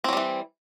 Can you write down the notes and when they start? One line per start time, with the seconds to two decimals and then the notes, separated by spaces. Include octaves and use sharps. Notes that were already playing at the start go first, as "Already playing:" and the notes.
0.04 C4
0.09 F#3
0.13 G3
0.17 E3